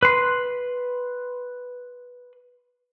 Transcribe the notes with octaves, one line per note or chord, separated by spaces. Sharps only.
B4 C6